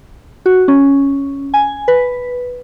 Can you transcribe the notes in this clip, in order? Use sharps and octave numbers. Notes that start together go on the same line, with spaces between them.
F#4
C#4
G#5
B4